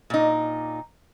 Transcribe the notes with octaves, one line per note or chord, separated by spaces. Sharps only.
A#2 D#4